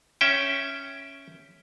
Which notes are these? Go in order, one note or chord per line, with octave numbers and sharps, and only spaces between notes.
C#4 E5 G5